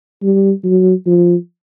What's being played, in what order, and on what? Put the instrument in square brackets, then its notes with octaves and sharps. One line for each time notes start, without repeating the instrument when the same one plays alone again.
[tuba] G3
F#3
F3